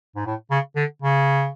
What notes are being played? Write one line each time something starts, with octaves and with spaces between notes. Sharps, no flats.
G#2
A2
C#3
D3
C#3